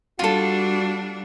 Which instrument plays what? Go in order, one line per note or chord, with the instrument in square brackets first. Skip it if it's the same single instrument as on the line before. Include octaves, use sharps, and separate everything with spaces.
[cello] G3 D4 [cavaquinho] F4 A4 [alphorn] F#4